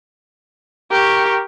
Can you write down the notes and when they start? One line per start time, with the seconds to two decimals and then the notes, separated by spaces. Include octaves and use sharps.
0.92 G4 A#4 C#6